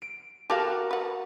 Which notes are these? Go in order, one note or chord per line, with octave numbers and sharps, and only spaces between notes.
D7
F#4 G4 A4 A#4 F5 A5
B4 F#5